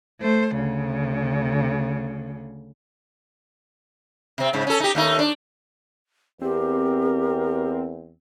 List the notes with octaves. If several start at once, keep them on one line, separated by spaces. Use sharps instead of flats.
A3 C5
D2 C#3
C3 C4
G#2 C#3
C#4 A4
D#4 G4
D#2 A3 D#4
D4
E2 C4 G4 A#4